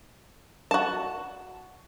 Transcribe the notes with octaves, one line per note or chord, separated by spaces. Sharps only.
F#4 A5